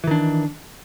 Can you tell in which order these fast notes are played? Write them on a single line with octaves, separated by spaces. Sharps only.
E3 D#3 D4